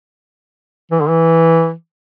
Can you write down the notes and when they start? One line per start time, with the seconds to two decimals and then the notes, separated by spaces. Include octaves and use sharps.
0.91 E3
1.01 D3
1.09 E3